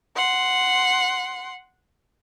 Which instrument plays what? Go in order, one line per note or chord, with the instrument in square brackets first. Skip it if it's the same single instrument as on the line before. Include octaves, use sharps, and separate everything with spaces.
[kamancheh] F#5 C6